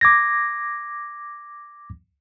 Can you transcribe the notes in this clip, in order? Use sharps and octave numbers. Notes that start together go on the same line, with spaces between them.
D6 G#6 A#6